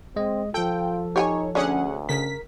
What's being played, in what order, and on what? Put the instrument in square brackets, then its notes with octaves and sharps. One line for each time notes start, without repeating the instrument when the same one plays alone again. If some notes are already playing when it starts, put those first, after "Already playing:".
[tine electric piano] G#3 D#5 [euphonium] C4
[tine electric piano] F3 A4 [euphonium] F4 [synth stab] G5
[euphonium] D#4 [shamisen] G4 G5 G#5 [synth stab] C#5
[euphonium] D2 [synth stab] C#4 G#4 F#5 [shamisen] D4
[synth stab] C#3 B6 [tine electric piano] A#4